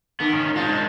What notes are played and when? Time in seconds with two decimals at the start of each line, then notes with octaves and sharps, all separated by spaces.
0.20 D3 B3 A#4
0.33 D#3 C#4
0.56 G#3 C4 D4 D#4 F4